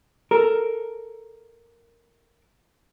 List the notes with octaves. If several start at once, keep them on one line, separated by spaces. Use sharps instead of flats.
A4 A#4